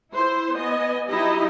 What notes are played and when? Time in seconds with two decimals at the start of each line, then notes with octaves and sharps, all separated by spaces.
0.13 E4 C5
0.54 B3 D#5 G#5
1.09 F#3 D#4 E4 G4 D#5